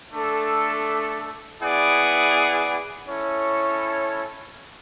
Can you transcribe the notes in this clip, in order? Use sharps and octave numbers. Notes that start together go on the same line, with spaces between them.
A3 D4 A4
B3 E4 G#4 D5 F#5
C#4 E4 A4 C#5